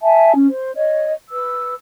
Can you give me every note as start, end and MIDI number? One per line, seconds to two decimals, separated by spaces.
0.01 0.32 76
0.01 0.32 80
0.01 0.32 81
0.35 0.47 61
0.49 0.76 72
0.76 1.13 73
0.76 1.13 75
1.31 1.74 71
1.31 1.74 88